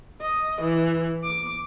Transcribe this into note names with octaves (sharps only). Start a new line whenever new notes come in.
D#5
E3
D6